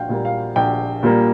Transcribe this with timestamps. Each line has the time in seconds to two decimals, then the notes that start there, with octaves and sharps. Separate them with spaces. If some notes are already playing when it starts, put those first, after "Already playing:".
Already playing: A#1 F5 G5
0.09 A#2 G3 A#3
0.25 F5
0.56 A#1 G5
1.03 A#2 G3 A#3